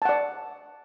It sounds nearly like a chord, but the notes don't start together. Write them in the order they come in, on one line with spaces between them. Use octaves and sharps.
A5 F#5 D5